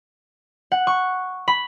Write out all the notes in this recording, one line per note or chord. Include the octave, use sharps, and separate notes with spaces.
F#5
C#6
B5